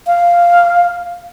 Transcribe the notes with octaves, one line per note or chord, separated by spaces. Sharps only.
F5